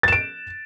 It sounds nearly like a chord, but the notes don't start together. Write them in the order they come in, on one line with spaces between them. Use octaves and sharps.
A6 E7 D7